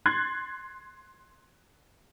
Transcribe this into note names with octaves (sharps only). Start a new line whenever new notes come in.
C6 F#6 G#6 A6